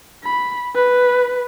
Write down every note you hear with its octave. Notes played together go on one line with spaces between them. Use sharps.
B5
B4